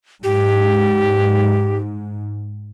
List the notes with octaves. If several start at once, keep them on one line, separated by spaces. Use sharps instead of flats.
G#2 G4